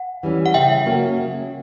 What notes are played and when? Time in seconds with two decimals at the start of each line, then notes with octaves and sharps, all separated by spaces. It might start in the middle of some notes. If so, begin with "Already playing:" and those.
Already playing: F#5
0.23 E3 G3 C#4
0.46 F#5
0.54 C#3 E5 G5
0.86 F#3 A#3 C#4 F#4
1.18 C#3